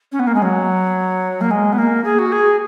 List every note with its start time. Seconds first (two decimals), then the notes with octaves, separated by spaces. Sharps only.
0.12 C#4
0.19 B3
0.27 A#3
0.34 G#3
0.42 F#3
1.41 A#3
1.50 G#3
1.72 B3
1.78 A#3
2.04 G#4
2.18 F#4
2.32 G#4